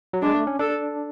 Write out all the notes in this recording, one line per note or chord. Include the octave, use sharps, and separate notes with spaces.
F#3
G#3 D4
A3
C#4
D4 A4